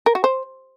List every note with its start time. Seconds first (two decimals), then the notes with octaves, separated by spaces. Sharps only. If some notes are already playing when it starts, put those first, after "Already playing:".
0.06 A#4
0.15 F#4
0.24 C5